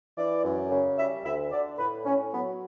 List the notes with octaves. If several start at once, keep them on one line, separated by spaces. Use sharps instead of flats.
E3 D5
F#2
C#3
G3 E5
D2 E5
D3 D5
A2 B4
A2 C#4
F#3 B3